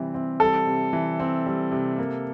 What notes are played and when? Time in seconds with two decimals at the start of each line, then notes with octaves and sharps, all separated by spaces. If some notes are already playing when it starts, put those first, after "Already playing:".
Already playing: C3 E3 G3 C4
0.14 C4
0.40 G3 A4
0.67 C3
0.93 E3
1.20 C4
1.46 G3
1.72 C3
1.98 A#3